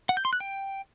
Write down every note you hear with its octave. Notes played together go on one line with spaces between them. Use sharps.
F#5
G6
C6
F#6
G5